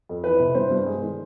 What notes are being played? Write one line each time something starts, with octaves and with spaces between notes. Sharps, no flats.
F2
E3 B4
C3
G2 C5
G2
G#3
D#3